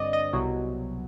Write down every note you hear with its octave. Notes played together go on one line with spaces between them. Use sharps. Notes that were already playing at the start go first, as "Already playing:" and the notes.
Already playing: G2 D3 C4 D5 D#5
D#5
C2 B2 F#3